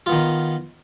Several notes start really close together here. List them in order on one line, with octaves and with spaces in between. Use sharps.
F4 B3 D#3